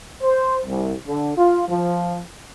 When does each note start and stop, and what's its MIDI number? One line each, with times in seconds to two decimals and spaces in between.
0.23 0.59 72
0.66 0.95 36
1.07 1.33 50
1.38 1.65 65
1.69 2.22 53